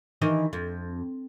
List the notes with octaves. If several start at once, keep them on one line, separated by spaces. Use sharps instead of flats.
D#3 E3 D#5
F2